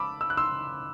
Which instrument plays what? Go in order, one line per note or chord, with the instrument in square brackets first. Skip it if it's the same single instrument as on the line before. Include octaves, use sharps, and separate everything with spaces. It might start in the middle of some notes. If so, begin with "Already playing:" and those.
Already playing: [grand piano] A5 B5 D6 E6
E6
F#6
C6 E6